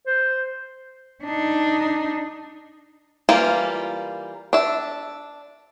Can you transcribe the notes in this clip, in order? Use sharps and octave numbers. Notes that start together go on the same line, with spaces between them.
C5
D4 D#4
E3 G3 A#3 F4
D4 E5